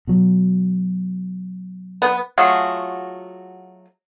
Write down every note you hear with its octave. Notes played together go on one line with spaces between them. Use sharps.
B2 F#3
B3
F#3 A3 F4 F#4 G#4